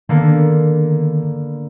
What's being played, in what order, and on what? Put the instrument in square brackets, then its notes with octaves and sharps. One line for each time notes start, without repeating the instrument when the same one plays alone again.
[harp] D3 A#3 B3 [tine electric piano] D#3